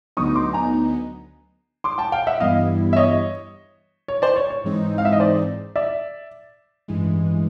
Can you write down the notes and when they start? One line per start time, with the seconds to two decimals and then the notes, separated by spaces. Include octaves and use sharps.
0.17 D2 D3 F#3 B3 D#4 C#6 D#6
0.35 C6 D6
0.53 G#5 A#5
1.84 C6 D6
1.98 G5 A5
2.12 F5 G5
2.27 E5 F#5
2.40 G2 E3 G3 B3 E4 D#5 F5
2.93 E5
2.97 C#5 D#5
4.08 C#5
4.22 C5 D5
4.36 C#5
4.50 C#5
4.64 G#2 E3 G#3 C4 D#4
4.98 F5
5.05 E5
5.13 D#5
5.20 C5 D5
5.76 D5 E5
6.88 A1 G2 E3 G#3